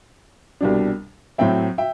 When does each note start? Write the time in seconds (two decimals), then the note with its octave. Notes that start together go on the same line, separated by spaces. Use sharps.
0.61 C2 B2 G3 D4
1.38 A2 F#3 C4 E5 G5
1.78 E5 G5